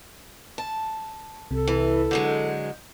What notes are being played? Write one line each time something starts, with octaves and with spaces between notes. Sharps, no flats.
A5
C2 C3 A4
E3
D3 F#3 G#3 G6